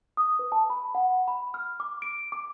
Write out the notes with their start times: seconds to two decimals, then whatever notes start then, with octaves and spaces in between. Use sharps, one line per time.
0.17 D#6
0.39 B4
0.52 A5
0.70 B5
0.95 F#5
1.28 B5
1.54 F6
1.80 D6
2.02 D7
2.32 D6